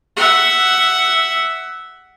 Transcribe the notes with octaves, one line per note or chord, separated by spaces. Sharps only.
E5 F#5